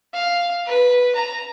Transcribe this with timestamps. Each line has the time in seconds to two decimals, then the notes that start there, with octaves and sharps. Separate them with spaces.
0.14 F5
0.66 B4
1.15 A#5